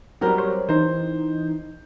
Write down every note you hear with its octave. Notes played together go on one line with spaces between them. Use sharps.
F#3 G3 C4 G4 A#4
C5 C#5
E3 D#4 C5